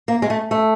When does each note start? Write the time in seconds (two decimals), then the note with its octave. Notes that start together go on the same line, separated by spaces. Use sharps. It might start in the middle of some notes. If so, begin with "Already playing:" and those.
0.08 A#3
0.22 G#3
0.30 A3
0.51 A3